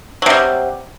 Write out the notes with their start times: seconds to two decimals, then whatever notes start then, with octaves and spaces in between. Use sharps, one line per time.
0.22 F#3
0.26 C3
0.30 G3